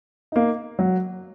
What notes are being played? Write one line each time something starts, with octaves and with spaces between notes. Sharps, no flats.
A#3 D#4
F#3